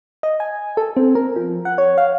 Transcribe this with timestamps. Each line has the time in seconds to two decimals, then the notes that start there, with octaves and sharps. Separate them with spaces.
0.23 D#5
0.40 G#5
0.77 A4
0.97 C4
1.15 A#4
1.36 F3
1.65 F#5
1.78 C#5
1.98 F5